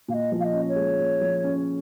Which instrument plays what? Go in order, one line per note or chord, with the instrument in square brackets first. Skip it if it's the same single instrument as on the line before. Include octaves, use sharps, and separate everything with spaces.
[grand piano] A#2 [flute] F5
[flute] D#5
[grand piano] F3
[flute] F5
D#5
[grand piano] C#4
[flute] C#5
[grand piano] G#3
A#2
F3
C#4